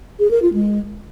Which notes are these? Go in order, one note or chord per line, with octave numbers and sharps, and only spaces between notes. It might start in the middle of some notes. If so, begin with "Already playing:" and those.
G#4
A#4
F4
G#3